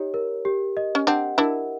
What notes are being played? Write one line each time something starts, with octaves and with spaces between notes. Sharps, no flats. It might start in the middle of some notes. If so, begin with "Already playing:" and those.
Already playing: D#4 G4 C#5
A#4
G4
D#5
C#4
C4 D4 F#5
D4 E4 A#4